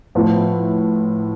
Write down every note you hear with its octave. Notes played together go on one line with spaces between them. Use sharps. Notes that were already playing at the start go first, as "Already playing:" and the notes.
A2 F3 B3